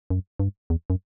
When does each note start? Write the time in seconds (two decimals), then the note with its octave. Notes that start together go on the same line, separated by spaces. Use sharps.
0.10 F#2
0.40 G2
0.70 E2
0.90 F#2